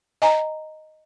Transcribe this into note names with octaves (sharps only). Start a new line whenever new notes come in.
D#5 G#5 A#5